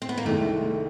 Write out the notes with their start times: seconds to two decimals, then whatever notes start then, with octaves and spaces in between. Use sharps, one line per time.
0.02 C4
0.09 B3
0.18 A#3
0.25 C2 C3 D#3 G#3 A3